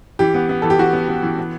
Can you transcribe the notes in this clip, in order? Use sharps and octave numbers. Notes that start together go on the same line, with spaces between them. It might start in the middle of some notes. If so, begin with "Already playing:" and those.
E3 G4
B3
B3
E3 A4
G4
E3 F#4
B3
B3
E3
B3